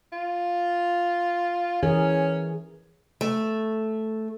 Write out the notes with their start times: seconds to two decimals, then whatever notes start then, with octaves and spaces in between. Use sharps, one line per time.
0.13 F4
1.83 E3 C#4 G#4 A#4
3.21 A3